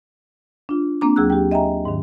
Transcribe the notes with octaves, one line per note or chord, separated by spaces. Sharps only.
D4 F4
A#3 C4 D4 A#5 D6
D#2 F#3 G#4 E6 F#6
G4 G5
D#5 E5 G5 G#5 A#5
G#2 D#3